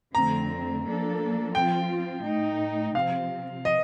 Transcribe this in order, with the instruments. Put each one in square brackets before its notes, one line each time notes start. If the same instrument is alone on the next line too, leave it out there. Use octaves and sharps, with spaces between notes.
[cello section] F2 D3 A3 C4 [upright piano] A#5
[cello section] F3 A#3 D4 A4
[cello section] F3 C4 F4 [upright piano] G5
[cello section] A2 A3 D#4
[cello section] C3 F3 C4 [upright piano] F5
[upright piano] D#5